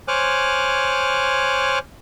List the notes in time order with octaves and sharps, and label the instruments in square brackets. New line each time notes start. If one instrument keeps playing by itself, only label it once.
[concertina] C5 C#5 G#5 D6 F6 F#6